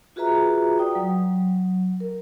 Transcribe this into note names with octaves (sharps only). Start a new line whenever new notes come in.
F4 F#4 G#4 B4 E5 A#5
D5 G5 D#6
F#3
A#4